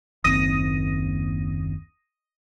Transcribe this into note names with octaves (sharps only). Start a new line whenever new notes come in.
F#1 D#2 C4 D#6 A#6 D#7